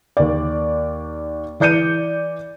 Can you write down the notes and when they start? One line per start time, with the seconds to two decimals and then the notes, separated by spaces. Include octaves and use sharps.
0.17 D#2 D5
1.60 E3 D5 G6 C#7 D#7